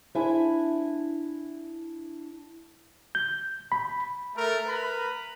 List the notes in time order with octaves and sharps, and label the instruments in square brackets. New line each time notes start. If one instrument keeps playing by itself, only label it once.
[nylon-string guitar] D4 E4 C5 E5 G#5
[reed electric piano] G6
B5
[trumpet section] A3 A#4
A#4 B4 A#5 B5